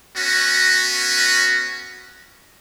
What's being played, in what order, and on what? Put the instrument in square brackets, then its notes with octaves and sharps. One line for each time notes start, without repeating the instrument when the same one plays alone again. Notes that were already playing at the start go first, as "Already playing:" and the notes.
[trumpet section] B3 C#4 F#4